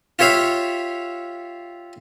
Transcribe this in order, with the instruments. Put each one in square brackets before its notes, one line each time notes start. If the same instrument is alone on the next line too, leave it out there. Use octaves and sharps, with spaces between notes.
[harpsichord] F4 G4 C#5 E5 F5